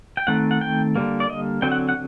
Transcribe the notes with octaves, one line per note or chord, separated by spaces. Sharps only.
G5
D#3 A3 C4 F#5
F#5
G5
D3 G3 A#3
D5
D#5
D3 F#3 C4 G5
F#5
F#5